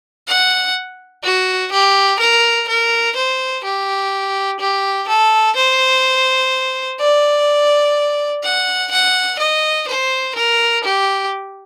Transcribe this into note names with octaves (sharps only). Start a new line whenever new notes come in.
F#5
F#4
G4
A#4
A#4
C5
G4
G4
A4
C5
D5
F#5
F#5
D#5
C5
A#4
G4